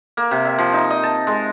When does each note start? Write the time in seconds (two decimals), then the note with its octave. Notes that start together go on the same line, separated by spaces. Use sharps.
0.17 A#3
0.31 C3
0.45 E5
0.59 F3
0.73 D#4
0.90 D#5
1.03 A5
1.27 G#3